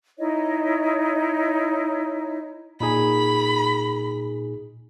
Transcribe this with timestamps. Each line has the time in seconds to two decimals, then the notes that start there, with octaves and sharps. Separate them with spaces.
0.18 D#4 E4 C#5 D#5
2.80 A#2 D#4 G#4 B5